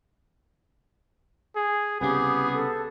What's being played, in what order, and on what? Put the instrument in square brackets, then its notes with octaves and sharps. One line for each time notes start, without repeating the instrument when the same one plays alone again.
[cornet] G#4
[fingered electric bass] C2 C#3 [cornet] B3 [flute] G4 [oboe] G#4
[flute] A4